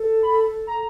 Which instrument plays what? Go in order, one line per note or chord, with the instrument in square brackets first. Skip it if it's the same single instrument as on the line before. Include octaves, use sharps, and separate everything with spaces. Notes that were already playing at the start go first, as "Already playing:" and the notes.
Already playing: [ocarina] A4
[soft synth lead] B5
A#5